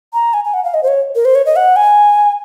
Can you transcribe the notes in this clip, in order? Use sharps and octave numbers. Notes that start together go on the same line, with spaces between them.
A#5
G#5
G#5
F#5
F5
D#5
C5
C#5
A#4
C5
C#5
D#5
F#5
G#5